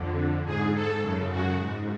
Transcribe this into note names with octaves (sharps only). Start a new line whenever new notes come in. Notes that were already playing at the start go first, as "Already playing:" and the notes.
Already playing: F2 D3
G#2 G#4
A4
F#2 C#3
F#4
G#2